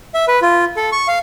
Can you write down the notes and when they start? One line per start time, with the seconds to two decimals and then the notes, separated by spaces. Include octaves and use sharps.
0.14 E5
0.28 B4
0.42 F4
0.77 A4
0.92 C#6
1.08 F5